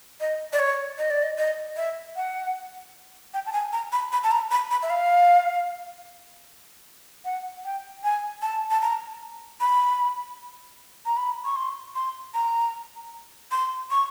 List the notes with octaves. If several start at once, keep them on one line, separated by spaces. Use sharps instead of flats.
D#5
D5
C#5
D#5
D5
D#5
D#5
E5
F#5
G5
A5
G#5
A#5
B5
B5
A5
A#5
B5
B5
E5
F5
F#5
G5
G#5
A5
A5
A#5
B5
A#5
B5
C#6
C6
C6
A#5
C6
C#6